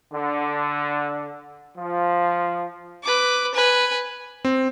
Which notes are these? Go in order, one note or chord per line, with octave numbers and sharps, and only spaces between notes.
D3
F3
B4 D6
B4 G#5
C4